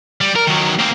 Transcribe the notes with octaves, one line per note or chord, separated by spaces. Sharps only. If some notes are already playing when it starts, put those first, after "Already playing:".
G3
A#4
D#3 F#3
A#3 C4